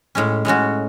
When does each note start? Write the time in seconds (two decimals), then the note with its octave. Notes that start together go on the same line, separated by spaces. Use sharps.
0.15 A2 G#3 C#4
0.45 A2 G#3 C#4 F#4